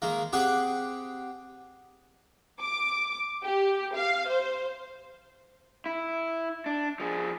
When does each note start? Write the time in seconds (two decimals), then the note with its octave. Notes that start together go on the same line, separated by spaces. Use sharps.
0.02 D#3 G#3 A#3
0.33 C4 G4 G#4 F#5
2.60 D6
3.42 G4
3.95 F5
4.28 C5
5.86 E4
6.66 D4
7.00 F3 G#4